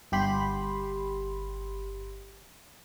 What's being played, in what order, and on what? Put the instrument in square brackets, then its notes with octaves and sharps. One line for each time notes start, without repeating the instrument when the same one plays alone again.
[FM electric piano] G1 G4 B5 C6